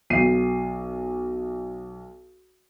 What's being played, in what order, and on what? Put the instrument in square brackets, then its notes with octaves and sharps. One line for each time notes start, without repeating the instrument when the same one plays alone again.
[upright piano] B1 C7 D#7